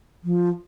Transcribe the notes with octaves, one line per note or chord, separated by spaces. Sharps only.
F3